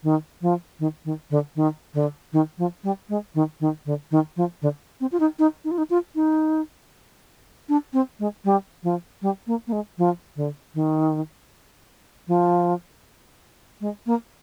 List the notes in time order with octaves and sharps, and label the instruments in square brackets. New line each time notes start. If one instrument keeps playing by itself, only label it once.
[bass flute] D#3
F3
D#3
D#3
D3
D#3
D3
D#3
F3
G3
G#3
D#3
D#3
D3
D#3
F3
D3
C4
F4
D#4
D#4
D#4
F4
D#4
F4
D#4
D4
C4
G#3
G3
F3
G3
A#3
A#3
G#3
F3
D3
D#3
F3
G#3
A#3